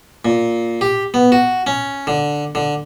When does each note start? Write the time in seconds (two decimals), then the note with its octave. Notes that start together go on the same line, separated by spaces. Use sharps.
0.25 A#2
0.81 G4
1.14 B3
1.32 F#4
1.67 C#4
2.07 D3
2.55 D3